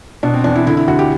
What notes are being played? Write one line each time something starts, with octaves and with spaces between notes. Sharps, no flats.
B2 D4
C4
E2 D4
E4
D3 E4
E4
D2 F#4
G4